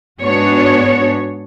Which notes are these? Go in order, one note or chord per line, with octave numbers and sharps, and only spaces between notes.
G#2 B3 D4 F#4 C#5